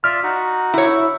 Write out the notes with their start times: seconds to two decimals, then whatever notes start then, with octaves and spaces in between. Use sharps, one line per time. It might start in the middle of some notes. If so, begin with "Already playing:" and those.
0.04 F4 D5 E5 F6
0.23 D#4 F#4
0.74 E4 C#5